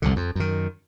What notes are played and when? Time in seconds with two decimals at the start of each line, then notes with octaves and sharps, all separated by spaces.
0.02 C2 F2 D3
0.16 F2
0.35 F#2 D#3